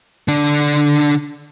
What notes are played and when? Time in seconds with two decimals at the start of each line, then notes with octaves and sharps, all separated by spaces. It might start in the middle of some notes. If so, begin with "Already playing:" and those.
0.28 D3 D4